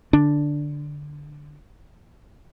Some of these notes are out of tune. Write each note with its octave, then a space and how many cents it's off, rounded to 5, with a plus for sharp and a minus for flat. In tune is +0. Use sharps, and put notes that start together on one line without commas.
D3 +0 D4 +0